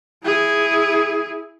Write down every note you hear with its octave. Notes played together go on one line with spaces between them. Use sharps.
E4 G#4